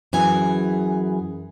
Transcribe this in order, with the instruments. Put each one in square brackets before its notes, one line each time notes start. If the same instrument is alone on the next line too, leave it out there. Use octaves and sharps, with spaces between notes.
[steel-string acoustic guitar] F#2 E3 G#4 G#5